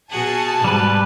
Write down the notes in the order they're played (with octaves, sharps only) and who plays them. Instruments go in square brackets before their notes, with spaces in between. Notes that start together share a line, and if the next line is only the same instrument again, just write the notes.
[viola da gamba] B2 F#4 G#4 [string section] G#5 A5
[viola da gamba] G#2 B2 [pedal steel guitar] G3 B4